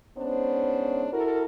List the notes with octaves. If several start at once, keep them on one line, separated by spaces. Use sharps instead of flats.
G#2 B3 C#4 D4 C5
E4 F#4 A4 A#4